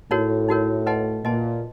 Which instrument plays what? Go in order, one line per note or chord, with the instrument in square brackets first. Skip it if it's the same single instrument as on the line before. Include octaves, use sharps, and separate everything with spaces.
[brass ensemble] A2 [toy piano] D#4 F#4 A#4 C#5
[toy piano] D#4 F#4 A#4 C#5
B4 D#5 F#5 A5 C6
[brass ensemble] A#2 [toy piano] B4 D#5 F#5 A5 C6